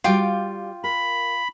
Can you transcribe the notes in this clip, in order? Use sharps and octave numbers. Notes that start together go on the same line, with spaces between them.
G3 F4 F#4 F5 G5 D6
A#4 B5